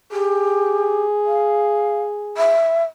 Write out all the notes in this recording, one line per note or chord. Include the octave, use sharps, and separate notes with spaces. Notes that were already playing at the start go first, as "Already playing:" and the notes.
G4 G#4
F5
E5